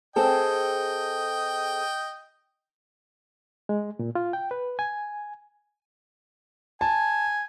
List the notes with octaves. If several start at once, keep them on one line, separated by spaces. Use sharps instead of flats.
C4 G#4 A4 D#5 G5
G#3
A#2
F4
G5
B4
G#5
G#5 A5